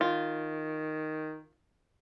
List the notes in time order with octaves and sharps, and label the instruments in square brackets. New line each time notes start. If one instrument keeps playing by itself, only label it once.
[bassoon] D#3 [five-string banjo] F4